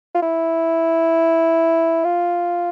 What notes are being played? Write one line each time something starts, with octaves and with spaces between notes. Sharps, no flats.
F4
E4
F4